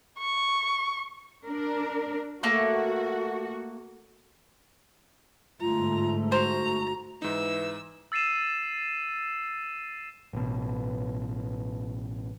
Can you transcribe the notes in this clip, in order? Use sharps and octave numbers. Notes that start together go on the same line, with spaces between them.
C#6
D4 A#4
A3 A#3 F#4 C#6
G1 G#2 A3 F4 A#5
F#4 C5 A#5
G#2 E3 D#4 E6
E6 A6 C7 D#7 E7
A1 B2